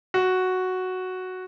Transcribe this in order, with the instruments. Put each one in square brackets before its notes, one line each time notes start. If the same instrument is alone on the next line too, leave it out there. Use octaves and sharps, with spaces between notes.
[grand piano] F#4